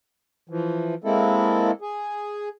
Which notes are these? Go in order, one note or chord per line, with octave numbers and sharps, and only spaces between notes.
E3 F3
G#3 A#3 C4 E4 A4
G#4